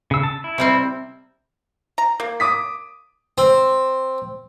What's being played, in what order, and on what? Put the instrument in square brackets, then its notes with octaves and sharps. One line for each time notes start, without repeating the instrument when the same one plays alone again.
[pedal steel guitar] C#3 E6
A5
E4
[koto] C3 G3 C4
[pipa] A#5
A#3
[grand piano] D6 D#6 B6
[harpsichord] C4